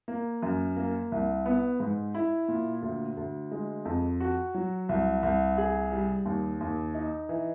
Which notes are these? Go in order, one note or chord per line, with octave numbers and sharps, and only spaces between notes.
A#3
F#2
A#3
C2
B3
G#2
E4
A#2
D2
D2
G#3
F2
F#4
F#3
C2
C2
G#4
G3
D#2
D#2
D#4
E3